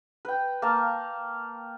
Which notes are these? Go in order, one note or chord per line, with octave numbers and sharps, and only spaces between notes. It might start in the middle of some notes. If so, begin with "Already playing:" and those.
B4 G5
A#3 F5 A5